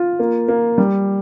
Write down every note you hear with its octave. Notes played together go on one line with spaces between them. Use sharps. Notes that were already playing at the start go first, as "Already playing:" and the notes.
Already playing: F4
A#3
A#3
G3